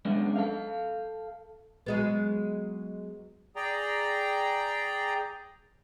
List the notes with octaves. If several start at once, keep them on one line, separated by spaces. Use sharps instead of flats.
G#3 B3 C#4 D4
A4 F5
F#3 G#3 B3
G#4 D5 G5 A#5